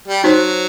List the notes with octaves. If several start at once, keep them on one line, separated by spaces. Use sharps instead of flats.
G3
F#3 D#4 F#4 C5